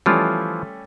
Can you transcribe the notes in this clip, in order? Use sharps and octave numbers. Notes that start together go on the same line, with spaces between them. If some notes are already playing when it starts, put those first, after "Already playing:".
E3 F3 G3 A3 C#4 F4